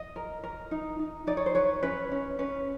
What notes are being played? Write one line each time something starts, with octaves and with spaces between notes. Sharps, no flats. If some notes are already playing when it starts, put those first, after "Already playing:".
Already playing: D#5
A#4
A#4
D#4
D#4
D#4 D5
C#5
C5
B4 C#5
C#4 B4
C#4
C#4 B4